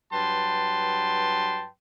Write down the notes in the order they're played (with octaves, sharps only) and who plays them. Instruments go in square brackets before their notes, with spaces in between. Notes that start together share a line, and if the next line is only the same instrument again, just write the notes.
[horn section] G2 F#3 B4 G5 A5 C6